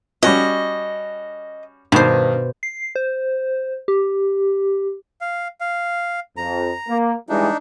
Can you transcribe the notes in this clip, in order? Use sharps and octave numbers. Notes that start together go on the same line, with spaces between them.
G3 C#4 F#4 D#5
G2 B2 D#3 C5
C7
C5
G4
F5
F5
F2 A#5
A#3
E3 G3 G#3 D4 D#4